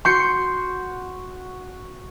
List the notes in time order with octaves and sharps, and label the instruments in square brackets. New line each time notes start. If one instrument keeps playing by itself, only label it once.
[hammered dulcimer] F#4 [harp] C6 G6 C#7